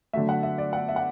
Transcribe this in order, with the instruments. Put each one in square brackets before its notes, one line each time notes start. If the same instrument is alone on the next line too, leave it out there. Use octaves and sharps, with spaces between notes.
[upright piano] D3 F#3 A3 E5
F#5
E5
D5
F#5
E5
F#5